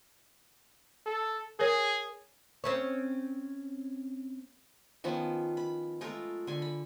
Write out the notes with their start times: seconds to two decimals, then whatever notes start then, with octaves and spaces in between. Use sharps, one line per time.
1.06 A4
1.60 G#4 A#4 C#5
2.64 C4 C#4 C#5
5.04 D#3 F3 B3 C#4
5.57 B5
6.01 G#3 A3 F4 A#4
6.47 D3 G#5
6.62 B5